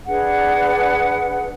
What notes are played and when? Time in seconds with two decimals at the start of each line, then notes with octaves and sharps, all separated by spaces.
0.06 D4 G#4 B4 F#5